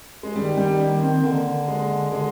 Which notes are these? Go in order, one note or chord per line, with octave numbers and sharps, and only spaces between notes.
G#3
D#3 G3
G3
A#3
C4
D3 A#3
G#3
D3 G#3